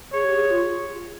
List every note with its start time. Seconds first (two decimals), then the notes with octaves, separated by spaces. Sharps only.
0.13 G#4 C#5
0.24 G4
0.35 G#4
0.51 F4